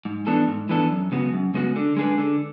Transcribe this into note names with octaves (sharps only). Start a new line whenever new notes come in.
G#2
E3 B3 D4 A4
G#2
E3 B3 D4 A4
F#2
C#3 G#3 B3 F#4
F#2
C#3 G#3 B3 F#4
D3
G#3 D4 G#4 B4
D3